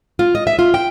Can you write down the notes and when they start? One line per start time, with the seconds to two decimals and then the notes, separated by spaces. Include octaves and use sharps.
0.19 F4
0.35 D#5
0.47 E5
0.59 F4
0.74 G5